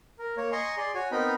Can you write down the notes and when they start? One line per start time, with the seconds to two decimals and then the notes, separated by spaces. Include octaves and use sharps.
0.19 A#4
0.37 A#3 C#5
0.52 D#5 G#5 A#5 C6 C#6
0.77 G#4 D5 C6
0.95 F#4 C#5 G#5
1.11 B3 C4 D#4 A#4 D#5 B5